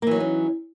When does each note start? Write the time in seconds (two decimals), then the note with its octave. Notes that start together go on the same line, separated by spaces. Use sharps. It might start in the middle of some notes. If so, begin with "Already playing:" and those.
0.02 A#3
0.07 E3
0.11 F#3
0.16 D#4
0.20 C#4